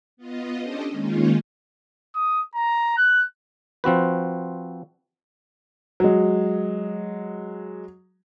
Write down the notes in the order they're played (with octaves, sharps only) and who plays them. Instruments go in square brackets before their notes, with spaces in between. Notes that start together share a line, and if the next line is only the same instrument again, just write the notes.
[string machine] B3 F4 D#5
C#4 D4 G4 A4 C5 D#5
D#3 G#3 A#3 C#4 D#4 F4
[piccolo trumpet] D#6
A#5
F#6
[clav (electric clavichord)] F3 C4 F#4 B4
[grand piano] F#3 G#3